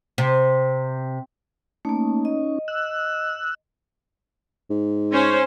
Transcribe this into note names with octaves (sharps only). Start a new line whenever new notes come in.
C3
A3 A#3 C#4 D#4
D#5
E6 F#6
G#2
C#4 C5